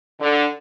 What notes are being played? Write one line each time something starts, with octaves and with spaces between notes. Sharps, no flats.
D3